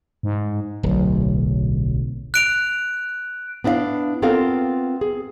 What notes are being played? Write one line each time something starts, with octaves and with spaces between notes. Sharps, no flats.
G#2
D1 B1
F#6 D7 F7
B3 D4 E4 D#5 F5
B3 C4 F4 A4 A#4 F5
G#4